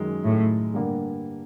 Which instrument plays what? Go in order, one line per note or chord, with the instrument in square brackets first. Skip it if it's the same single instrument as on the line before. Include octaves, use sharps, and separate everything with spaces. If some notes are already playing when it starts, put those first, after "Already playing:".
Already playing: [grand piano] F#2 D#3 G#3
[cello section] A2
[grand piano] G2 D3 G3 A#3